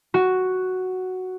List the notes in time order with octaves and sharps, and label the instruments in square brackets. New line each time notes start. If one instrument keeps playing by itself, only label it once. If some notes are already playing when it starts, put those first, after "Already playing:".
[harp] F#4